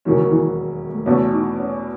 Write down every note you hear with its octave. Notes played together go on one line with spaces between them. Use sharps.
E1 D#2 D#3 E3 F#3 C#4
E3
A3
E2 B2 A3 C#4
D#4
C#4